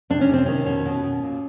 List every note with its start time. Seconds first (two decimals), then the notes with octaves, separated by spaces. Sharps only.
0.10 C3 D4
0.21 C#4
0.29 C3 C4
0.46 D#3 C#4
0.66 B2 C#4
0.85 B2
1.03 B2
1.23 A#2